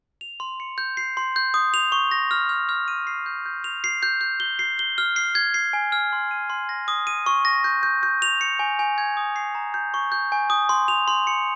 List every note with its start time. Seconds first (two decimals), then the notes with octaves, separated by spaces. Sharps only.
0.21 F7
0.40 C6
0.60 C#7
0.78 G6
0.97 C7
1.17 C6
1.36 G6
1.54 D#6
1.74 F7
1.92 C#6
2.11 A#6
2.31 F6
2.49 F6
2.69 F6
2.88 D#7
3.07 C7
3.26 G6
3.46 G6
3.64 F7
3.84 C7
4.03 G6
4.21 G6
4.40 G7
4.59 C7
4.79 G7
4.98 F6
5.16 C7
5.35 G#6
5.54 C7
5.73 G#5
5.92 F6
6.13 C6
6.31 D#7
6.50 C6
6.69 A#6
6.88 D#6
7.07 D#7
7.26 C#6
7.45 A#6
7.64 G6
7.83 G6
8.03 G6
8.22 F7
8.41 C#7
8.59 G#5
8.79 G#5
8.98 G#6
9.17 D#6
9.36 C7
9.55 A#5
9.74 G6
9.94 C#6
10.12 G6
10.32 G#5
10.50 D#6
10.69 C6
10.88 F7
11.08 C6
11.27 C#7